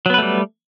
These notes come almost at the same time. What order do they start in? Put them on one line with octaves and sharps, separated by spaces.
F#3 B3 B4 A3 G3